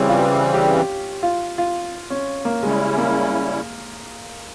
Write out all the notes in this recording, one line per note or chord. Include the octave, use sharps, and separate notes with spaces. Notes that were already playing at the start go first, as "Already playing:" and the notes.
Already playing: C#3 E3 G3 C4 C#4
F4
G4
G4
F4
F4
C#4
A#3
C#3 G3 G#3 C#4 E4
A#3